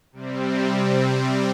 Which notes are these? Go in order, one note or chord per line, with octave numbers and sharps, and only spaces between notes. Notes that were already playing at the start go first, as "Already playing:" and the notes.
C3 G3 C4